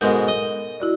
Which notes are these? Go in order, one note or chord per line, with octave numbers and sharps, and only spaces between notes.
G#2 B2 G#3 A4 A#4 G6
D#5
E4 F#4 D5